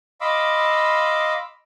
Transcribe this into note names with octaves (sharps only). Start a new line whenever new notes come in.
D#5 F5 B5 C6 D6 E6